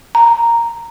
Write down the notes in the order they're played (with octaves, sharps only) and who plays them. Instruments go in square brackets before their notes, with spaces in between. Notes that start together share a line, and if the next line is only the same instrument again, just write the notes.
[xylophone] A#5